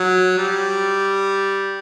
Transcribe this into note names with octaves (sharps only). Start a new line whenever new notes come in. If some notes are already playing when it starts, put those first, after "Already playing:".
Already playing: F#3
G3